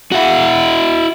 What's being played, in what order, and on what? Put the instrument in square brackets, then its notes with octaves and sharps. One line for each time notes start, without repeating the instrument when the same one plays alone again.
[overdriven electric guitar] E4 F#4